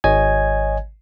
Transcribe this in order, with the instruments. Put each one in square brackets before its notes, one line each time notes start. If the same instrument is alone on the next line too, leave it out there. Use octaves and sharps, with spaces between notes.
[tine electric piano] G#1 C#5 D#5 G#5 G#6